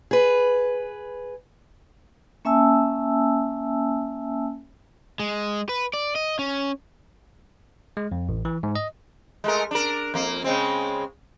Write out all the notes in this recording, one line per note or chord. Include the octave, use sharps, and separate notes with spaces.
G#4 B4
A#3 C#4 E5 G#5 A5 E6
G#3
B4
D5
D#5
C#4
G#3
F2
A1
E3
G#2
D#5
G#3 A3 A#4
D4 A#4
F2 A#3
C#3 G#3 C4